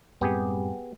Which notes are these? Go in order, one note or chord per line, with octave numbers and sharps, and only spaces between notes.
F#2 A2 G3 B3 C4 G4 G#4